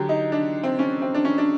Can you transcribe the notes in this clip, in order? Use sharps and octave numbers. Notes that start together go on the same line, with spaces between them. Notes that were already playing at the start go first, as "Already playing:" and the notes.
Already playing: D3 F#3 G4
D#4
D4
C4
C#4
C4
D4
C#4
D4